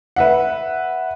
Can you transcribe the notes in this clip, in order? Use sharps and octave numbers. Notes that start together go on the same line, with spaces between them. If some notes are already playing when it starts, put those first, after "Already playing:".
B4 E5 F#5